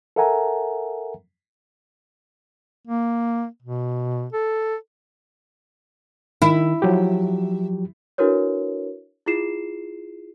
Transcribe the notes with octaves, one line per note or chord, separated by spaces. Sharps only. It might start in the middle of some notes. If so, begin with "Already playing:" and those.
A4 A#4 E5 F#5 G#5 A#5
A#3
B2
A4
D#3 E4
F3 F#3 G4
D4 E4 F#4 A#4 B4 C#5
E4 F4 G#4 C7 E7